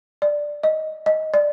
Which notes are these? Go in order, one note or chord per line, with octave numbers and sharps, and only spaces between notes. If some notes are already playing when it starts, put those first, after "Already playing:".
D5
D#5
D#5
D5